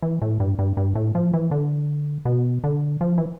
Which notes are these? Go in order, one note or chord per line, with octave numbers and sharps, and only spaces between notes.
E3
A2
G2
G2
G2
A2
F3
E3
D3
B2
D3
F3
E3